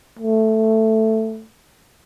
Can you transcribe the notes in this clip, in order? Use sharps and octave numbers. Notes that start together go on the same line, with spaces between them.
A3